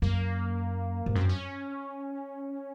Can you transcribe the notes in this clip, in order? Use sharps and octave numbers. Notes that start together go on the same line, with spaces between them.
F#2 A#3
G#2
F#2 C4
C#4